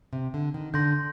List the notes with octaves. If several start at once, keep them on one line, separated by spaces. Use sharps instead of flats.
C3
D3
D#3
D3 C6 G6 A#6